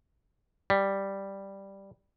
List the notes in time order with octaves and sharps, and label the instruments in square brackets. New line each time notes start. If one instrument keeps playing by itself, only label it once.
[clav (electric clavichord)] G3